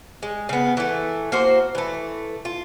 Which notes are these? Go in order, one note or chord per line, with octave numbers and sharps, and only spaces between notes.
G#3
C#3 B3
E3 A3
A#3 F#4 C5
E3 A3
F4